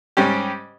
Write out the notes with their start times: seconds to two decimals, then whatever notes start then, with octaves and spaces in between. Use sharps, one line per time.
0.17 G#2 G3 C#4 G4